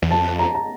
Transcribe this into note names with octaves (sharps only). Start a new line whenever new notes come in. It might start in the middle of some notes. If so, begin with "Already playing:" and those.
E2
F2 A5
A#5
A#5